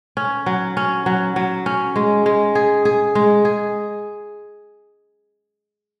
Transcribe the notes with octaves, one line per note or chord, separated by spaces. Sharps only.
C#4
F#3
C#4
F#3
F#3
C#4
G#3
G#3
G#4
G#4
G#3
G#4